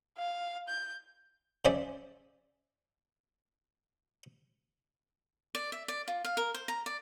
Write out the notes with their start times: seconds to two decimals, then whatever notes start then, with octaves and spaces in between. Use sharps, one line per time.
0.18 F5
0.69 G6
1.65 C#3 C5 D5 E5 G#5
5.55 D5
5.72 E5
5.88 D5
6.08 F4
6.24 F5
6.37 A#4
6.54 C5
6.68 A#5
6.86 D5